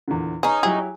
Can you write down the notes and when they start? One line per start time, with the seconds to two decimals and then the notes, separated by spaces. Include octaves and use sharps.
0.08 E2 A#2 D3
0.43 C#4 D#4 G#4 B4
0.63 F#3 E4 G4 G#4